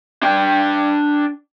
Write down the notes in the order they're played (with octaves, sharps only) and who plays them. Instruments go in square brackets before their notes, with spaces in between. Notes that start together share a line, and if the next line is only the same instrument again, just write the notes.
[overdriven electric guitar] D4 G5